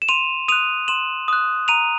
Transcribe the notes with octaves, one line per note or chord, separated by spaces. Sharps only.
E7
C6 D#7 F7
D#6 F#6 D#7 F7
C6 E7 F#7
D#6 F#6
A#5 D#7 F7